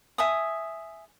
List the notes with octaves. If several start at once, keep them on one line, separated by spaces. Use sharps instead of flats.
E5 G#5 D#6